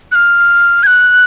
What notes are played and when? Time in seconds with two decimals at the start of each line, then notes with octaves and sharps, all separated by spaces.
0.12 F#6
0.15 F6
0.83 G#6
0.87 F#6